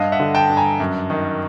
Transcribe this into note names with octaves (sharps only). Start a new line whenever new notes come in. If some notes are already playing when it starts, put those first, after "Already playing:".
Already playing: G2 D#5 F5
E5 F#5
D3
G5 A5
G2
G#5 A#5
F#2
D#3